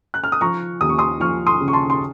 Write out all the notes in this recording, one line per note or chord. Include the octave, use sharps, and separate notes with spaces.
F#6
F6
D#6
F3 A#5 C#6
D#2 D#6
C#6
C6 D#6
F3 C#6 F6
C6 D#6
C#3
C#6
A5 C6
C6